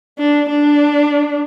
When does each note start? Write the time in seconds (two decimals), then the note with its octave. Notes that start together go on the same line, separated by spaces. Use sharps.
0.19 D4
0.49 D4